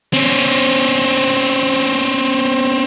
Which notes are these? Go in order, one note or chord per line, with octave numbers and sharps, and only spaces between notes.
C4 C#4